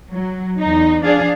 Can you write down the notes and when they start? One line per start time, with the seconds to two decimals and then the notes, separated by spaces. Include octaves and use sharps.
0.12 F#3
0.59 E2 D#4
1.03 F3 D4 G#4 F5